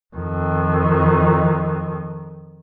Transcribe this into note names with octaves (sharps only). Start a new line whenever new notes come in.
F2 D#3